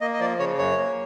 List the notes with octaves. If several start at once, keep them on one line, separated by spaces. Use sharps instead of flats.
A#3 D#5
D#5
F3 D5
C#3 C#5
F#2 C#5
A#3